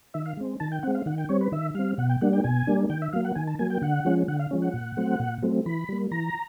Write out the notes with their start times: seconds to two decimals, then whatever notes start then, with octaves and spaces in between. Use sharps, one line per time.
0.14 D#3 E5
0.26 F5
0.37 G#3 C4
0.60 D#3 A5
0.72 G5
0.83 G#3 C4 F#5
0.95 F5
1.06 D#3 F#5
1.18 G5
1.29 G3 C4 C#5
1.41 B4
1.52 D#3 E5
1.75 G3 C4 F5
1.98 B2 F#5
2.09 G5
2.21 G3 A#3 D4 F#5
2.33 G5
2.44 B2 G#5
2.67 G3 A#3 D4
2.90 D#3 G5
3.02 E5
3.13 F#3 A#3 F5
3.24 F#5
3.35 D#3 G#5
3.47 A5
3.59 F#3 A#3 G#5
3.70 G5
3.82 D3 F#5
4.05 F3 G#3 C#4
4.28 D3 F#5
4.39 F5
4.51 F3 G#3 C#4
4.62 F#5
4.74 A#2
4.97 F#3 A3 C4
5.19 A#2
5.43 F#3 A3 C4
5.66 E3 B5
5.89 G3 A#3
6.11 E3 A#5